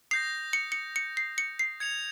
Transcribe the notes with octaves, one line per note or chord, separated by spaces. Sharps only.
D#6 G6 A#6 C7
C#7
C#7
C#7
C7
C#7
C7
G#6 C#7 F7